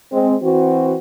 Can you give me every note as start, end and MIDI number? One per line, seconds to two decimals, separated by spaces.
0.13 0.35 56
0.13 0.35 60
0.43 0.96 52
0.43 0.96 60
0.43 0.96 66